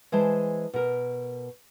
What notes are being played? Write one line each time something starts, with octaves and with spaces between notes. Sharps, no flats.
E3 G#3 C5 A5
B2 A#4